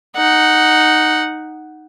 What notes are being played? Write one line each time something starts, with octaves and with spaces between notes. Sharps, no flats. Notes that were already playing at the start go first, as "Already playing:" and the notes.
D#4 F#5